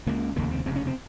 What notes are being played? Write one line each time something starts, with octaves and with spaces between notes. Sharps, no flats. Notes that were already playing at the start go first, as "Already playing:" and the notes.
C#2 C#3 A#3
F1 D#2 C#3 A#3
C4
F1 D#2 C#3 C4
C#4
C4